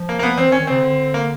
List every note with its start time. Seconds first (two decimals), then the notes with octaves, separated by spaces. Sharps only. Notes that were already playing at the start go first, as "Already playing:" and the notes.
Already playing: F3
0.09 A#3
0.19 A#3
0.23 B3
0.38 E3 C4
0.48 D#3
0.52 C#4
0.60 D#3
0.67 C#3 C4
0.81 D3
1.14 A#3